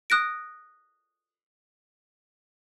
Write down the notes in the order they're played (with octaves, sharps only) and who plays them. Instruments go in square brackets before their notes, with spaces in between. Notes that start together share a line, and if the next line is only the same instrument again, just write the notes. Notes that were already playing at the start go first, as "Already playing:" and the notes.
[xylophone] D#6 F#6 A#6 D7